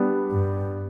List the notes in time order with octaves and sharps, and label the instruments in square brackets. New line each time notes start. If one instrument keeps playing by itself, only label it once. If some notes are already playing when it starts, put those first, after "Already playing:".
Already playing: [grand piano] G3 B3 D4 G4
[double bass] G2